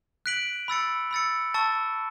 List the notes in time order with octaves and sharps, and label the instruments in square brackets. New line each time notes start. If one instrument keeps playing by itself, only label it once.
[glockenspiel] F#6 B6 D7 F#7
B5 E6 A6 C#7
B5 E6 A6 C#7
A5 C#6 E6 A6